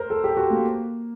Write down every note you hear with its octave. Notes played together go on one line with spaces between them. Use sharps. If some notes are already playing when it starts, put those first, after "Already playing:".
Already playing: A#4 C5
A4
G4
F#4
A#3